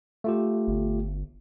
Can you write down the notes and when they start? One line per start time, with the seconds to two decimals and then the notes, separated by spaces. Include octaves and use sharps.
0.24 A3 F4 G4
0.68 G1